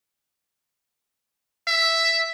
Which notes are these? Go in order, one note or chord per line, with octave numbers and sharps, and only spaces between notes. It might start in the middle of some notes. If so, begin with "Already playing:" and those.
E5